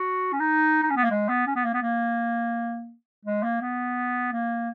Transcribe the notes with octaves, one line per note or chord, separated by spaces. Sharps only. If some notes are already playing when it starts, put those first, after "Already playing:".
Already playing: F#4
C#4
D#4
D#4
C#4
B3
A#3
G#3
B3
C#4
B3
A#3
B3
A#3
G#3
A#3
B3
A#3